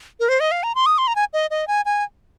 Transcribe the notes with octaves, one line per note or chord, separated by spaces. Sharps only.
A#4
C5
D#5
F5
A#5
C6
D#6
C6
A#5
G#5
D#5
D#5
G#5
G#5